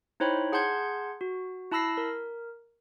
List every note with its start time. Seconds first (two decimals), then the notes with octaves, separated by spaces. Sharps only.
0.20 D#4 E4 C5 C#5 G5 B5
0.52 G#4 F#5 A5 C6 G6 G#6
1.21 F#4
1.71 E4 A5 B5 E6 A#6 C7
1.97 A#4